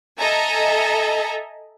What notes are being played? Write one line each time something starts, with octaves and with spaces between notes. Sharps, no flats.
A4 D#5 E5 G#5 A#5